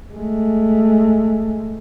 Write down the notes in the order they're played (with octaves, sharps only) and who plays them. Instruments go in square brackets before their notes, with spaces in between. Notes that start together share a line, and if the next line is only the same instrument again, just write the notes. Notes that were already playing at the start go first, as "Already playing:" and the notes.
[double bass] G#3 A3